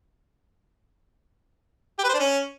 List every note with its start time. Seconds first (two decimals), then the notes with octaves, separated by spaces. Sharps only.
1.99 G4
2.04 B4
2.09 C5
2.14 D4
2.20 C#4